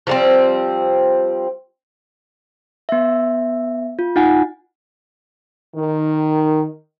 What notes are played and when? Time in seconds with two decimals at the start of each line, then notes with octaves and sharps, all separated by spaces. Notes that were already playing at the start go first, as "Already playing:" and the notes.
0.07 F3 G3 C4
2.89 B3 E5
3.99 F4
4.16 D#4 F4 F#5 G#5
5.76 D#3